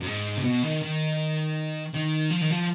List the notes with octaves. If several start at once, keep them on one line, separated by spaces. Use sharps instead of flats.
F#2
G#2
C#3
B2
D#3
D#3
D#3
F3
D#3
F3